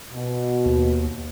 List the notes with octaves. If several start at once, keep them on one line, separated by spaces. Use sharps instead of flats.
B2
D#2